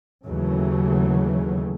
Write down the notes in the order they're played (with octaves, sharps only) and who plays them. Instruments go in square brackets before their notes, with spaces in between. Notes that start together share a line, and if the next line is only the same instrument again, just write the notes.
[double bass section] D#2 C#3 E3 F#3 A3